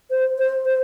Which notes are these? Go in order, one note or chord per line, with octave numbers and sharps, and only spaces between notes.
C5
C5
C5